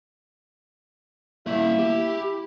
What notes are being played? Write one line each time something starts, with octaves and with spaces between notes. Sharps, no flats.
A#3 E4 E5
G4